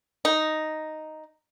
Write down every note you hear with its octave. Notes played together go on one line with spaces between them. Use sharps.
D#4